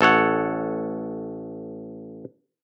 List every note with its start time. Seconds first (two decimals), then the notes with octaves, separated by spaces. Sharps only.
0.01 A1 A4 C#5 F#5